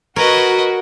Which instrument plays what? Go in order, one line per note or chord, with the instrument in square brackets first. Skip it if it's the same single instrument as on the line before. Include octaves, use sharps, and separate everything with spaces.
[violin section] F#4 [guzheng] A#4 C#5 [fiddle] B4 D#5